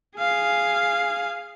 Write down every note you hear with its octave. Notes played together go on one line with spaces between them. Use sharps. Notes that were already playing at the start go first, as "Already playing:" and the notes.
G#4 F5